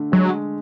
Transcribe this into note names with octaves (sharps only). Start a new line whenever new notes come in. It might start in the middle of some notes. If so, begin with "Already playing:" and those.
Already playing: D3 A3
F#3 G#3